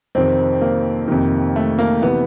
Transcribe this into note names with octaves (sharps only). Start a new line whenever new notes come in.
F2 C3 D#3 C4
A#3
F2 C3 D#3
A3
A#3
C3 E3 B3